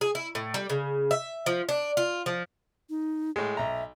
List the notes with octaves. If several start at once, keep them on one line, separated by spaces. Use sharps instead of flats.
G#4
E4
A2
G3
C#3
E5
F3
D4
F4
F3
D#4
A2 G#3
B1 E5 A#5